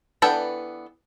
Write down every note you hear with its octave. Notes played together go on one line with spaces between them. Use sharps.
E3 B3 D4 A4 G5